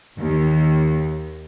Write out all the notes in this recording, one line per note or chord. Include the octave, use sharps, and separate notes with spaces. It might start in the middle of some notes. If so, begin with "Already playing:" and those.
D#2